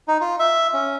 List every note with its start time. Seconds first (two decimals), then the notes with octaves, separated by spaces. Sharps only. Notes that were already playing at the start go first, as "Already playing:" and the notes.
0.08 D#4
0.21 F4
0.39 E5
0.73 C#4